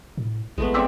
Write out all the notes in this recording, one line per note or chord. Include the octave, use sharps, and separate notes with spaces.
A2
A1 G#3 A3 B3
C4 D5 E5